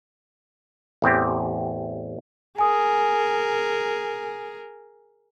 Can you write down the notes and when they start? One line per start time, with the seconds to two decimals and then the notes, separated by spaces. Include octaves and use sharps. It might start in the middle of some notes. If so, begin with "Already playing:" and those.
1.02 A1 E2 C4 G4
2.59 G#4 A#4 G#5 D#6